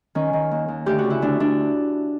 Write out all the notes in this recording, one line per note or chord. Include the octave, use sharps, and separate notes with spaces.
D#3 C#4
D#3
D#2
D#2
D2 G4
F#4
C#3
E4
D2 D4
D2 D4